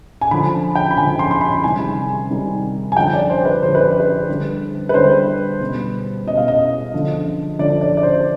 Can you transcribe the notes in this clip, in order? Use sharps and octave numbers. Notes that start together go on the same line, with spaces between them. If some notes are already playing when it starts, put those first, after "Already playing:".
G#5
D3 F3 B5
G5
B5
D3 F3 G#5
C6
C6
B5
C3 D#3 G3 G#5
C3 D#3 G3
G#5
D3 F3 G5
D5
C5
B4
D3 F3 C5
B4
B4
D3 G3
B4
D3 G3 C5
B2 G3
B2 G3 D#5
F5
D#5
D3 F3
D3 F3 D5
D5
D5
C5